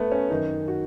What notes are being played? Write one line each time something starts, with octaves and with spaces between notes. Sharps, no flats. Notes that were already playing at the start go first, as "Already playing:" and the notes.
Already playing: A3 B3
C#4
F#2 D#3 D#4
F#4